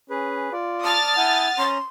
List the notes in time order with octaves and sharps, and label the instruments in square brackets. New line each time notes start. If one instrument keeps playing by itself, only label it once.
[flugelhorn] C#4 [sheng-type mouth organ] G#4 B4
[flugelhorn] F4 [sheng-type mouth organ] D5
[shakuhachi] A5 [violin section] D#6 F6 A6
[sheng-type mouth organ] E4 G#5 G6 [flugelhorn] F#5
[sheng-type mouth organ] C#4 A#5 [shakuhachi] C6